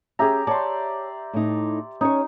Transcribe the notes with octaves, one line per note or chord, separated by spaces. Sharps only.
C#4 G4 G#4 E5 A#5
C#5 D5 A5 C6
A2 D#4
C#4 D#4 C#5